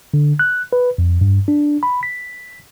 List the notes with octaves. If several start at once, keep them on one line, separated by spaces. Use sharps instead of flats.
D3
F#6
B4
F2
G2
D4
B5
B6